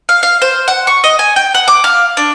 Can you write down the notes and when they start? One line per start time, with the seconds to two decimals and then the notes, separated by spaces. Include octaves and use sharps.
0.09 F5
0.23 F5
0.42 C5
0.68 F#5
0.87 C#6
1.04 D#5
1.19 G#5
1.36 G5
1.55 F#5
1.68 D6
1.84 F5
2.17 D4